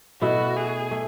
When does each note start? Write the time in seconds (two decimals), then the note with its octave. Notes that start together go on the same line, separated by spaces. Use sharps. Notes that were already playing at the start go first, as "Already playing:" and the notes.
0.22 B2 A3 E4 F#4 A4
0.56 G#4
0.91 A3